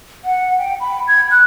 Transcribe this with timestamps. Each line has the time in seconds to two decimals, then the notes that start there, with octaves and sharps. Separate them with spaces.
0.25 F#5
0.58 G5
0.80 B5
1.08 G#6
1.31 F#6